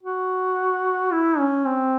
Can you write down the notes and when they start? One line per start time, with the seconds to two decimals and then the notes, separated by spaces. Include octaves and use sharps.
0.03 F#4
1.11 E4
1.38 C#4
1.65 C4